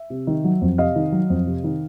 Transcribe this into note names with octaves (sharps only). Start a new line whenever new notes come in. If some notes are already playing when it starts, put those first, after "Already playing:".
Already playing: E5
C3
D#3
F#3
F2
C3 D#5 F5
D#3
F#3
F2
C3
D#3